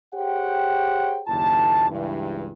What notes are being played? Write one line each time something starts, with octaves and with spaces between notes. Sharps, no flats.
G4 G#4 C5 C#5 F#5 G5
F#1 D#2 A#2 E4 A5
C#2 G2 E3